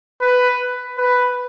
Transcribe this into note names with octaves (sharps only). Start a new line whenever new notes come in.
B4
B4